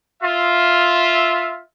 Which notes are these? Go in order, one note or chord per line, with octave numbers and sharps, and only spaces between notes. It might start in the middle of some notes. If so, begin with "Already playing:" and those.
F4 E5